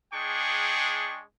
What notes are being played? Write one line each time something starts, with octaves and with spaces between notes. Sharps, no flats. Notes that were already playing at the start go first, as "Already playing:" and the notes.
G#3 D4 G#4 G5 C#6